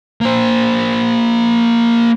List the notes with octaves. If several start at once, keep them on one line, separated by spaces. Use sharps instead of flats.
A#3 C5